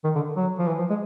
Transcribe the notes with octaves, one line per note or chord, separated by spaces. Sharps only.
D#3
D3
F#3
F3
E3
F3
G#3